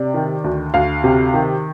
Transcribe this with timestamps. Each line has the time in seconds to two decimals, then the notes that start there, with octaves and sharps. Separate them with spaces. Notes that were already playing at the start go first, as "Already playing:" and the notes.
Already playing: C3 D5
0.14 D#3
0.44 D2
0.74 D2 F5
1.04 C3
1.34 D#3